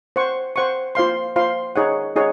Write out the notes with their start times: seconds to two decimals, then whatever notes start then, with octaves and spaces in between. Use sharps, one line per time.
0.16 C5 F#5 C#6
0.56 C5 F#5 C#6
0.95 F4 C5 F5 C6
1.36 F4 C5 F5 C6
1.76 D#4 G#4 C#5 F#5
2.16 D#4 G#4 C#5 F#5